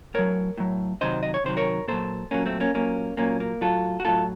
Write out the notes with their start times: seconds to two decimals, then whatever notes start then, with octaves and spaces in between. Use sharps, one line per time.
0.14 A2 F#3 A#4 C#5
0.58 A2 F#3
1.01 C3 D#3 F#3 C5 D#5
1.23 D#5
1.34 C#5
1.44 C3 D#3 F#3 C5
1.57 A#4 C#5
1.88 A#2 F#3 A4 C5
2.31 A#2 F#3 A#3 C#4
2.46 A3 C4
2.60 A#3 C#4
2.75 A#2 F#3 A#3 C#4
3.17 A#2 F#3 A#3 C#4
3.40 A#3
3.61 A2 F#3 F4 A4
4.00 F#4
4.05 A2 F#3 F4 A4